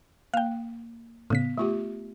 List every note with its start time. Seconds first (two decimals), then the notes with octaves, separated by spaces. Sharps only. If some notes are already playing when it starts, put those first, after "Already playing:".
0.34 A#3 F5 G5
1.30 A2 C#3 B3 B6
1.58 A3 F4 G4